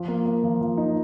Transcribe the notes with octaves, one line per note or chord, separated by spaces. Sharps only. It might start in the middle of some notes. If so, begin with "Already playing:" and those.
Already playing: F3
A#3
A#3
F3
F3
D#4